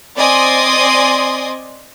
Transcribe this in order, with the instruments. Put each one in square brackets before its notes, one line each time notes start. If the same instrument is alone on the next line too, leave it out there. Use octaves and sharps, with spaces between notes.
[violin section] C4 D5 D#5 G#5 C6 D#6